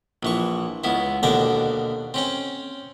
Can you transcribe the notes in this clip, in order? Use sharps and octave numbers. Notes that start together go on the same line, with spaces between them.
A#1 E3 C#6
C#2 B3 E4
D#2 B2 D3 A#4 D5 G5
C4 C#4 G5